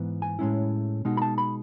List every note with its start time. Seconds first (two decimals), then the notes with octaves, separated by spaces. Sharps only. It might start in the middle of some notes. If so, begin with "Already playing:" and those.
Already playing: G#2 E3 B3
0.22 G#5
0.39 A2 G#3 C#4 E4
1.05 B2 G#3 D#4
1.17 B5
1.22 A5
1.38 B5